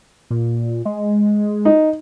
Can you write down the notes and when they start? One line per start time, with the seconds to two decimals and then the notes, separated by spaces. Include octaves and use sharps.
0.31 A#2
0.85 G#3
1.65 D#4